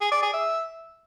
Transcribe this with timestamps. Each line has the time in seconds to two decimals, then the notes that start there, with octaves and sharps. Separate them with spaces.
0.01 G#4
0.12 D5
0.23 G#4
0.33 E5